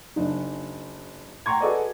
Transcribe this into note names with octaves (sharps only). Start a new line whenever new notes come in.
F#1 D4 D#4
F#5 G5 A#5 C6 C#6 G#6
F#4 G#4 A4 B4 D5 D#5